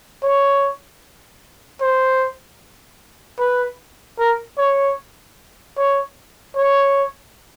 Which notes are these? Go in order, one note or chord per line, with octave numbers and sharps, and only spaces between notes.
C#5
C5
B4
A#4
C#5
C#5
C#5